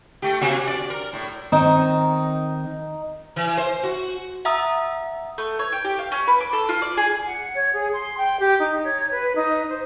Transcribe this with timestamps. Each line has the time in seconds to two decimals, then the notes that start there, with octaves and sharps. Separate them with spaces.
0.22 A3 G4
0.41 C3 A#3 F#4
0.67 D5
0.90 A#4
1.13 A2
1.52 D#3 C4 D#4
3.36 E3
3.57 C5
3.83 F#4
4.45 E5 F#5 A#5 D#6 E6
5.38 A3
5.59 C#5
5.72 G5
5.84 G4
5.99 F5
6.12 C#4
6.27 B4
6.41 D6
6.53 A4
6.69 F4
6.82 D5
6.97 G#4
7.26 F#5
7.55 C#5
7.73 G#4
7.93 C6
8.18 G5
8.40 G4
8.60 D#4
8.84 C#5
9.11 B4
9.36 D#4
9.69 C5